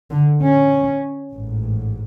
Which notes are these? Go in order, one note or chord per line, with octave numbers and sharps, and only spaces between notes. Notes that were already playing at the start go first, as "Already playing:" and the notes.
D3
C#4
A1 G#2